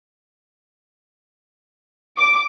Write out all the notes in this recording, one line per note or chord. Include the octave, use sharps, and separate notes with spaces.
D6